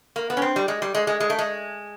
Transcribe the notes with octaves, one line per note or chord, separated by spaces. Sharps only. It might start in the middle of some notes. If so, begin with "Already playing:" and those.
A#3
B3
C#4
C4
G3
G#3
G3
G#3
G#3
G#3
A3
G#3